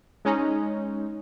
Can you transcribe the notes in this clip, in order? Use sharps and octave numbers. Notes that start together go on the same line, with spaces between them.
G#3 C#4 D#4